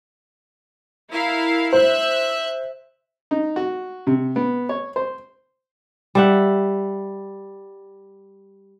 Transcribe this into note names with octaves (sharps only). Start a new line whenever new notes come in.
E4 A#4 F5
C5 E5 F#6
D#4
F#4
C3
B3
C#5
C5
G3 E5 F#5